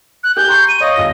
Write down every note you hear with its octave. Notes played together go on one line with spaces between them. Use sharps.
F#6
G4 G#5 G6
A#5 C6 C#6
D#7
C#5 D#5 F5 C#6
G1 F4 A#6